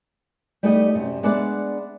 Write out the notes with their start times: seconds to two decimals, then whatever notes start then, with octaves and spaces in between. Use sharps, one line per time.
0.63 G3 A3 B3 D#4 G4 D#5
0.94 F#2 C3
1.23 G#3 B3 D4 D5 E5 F#5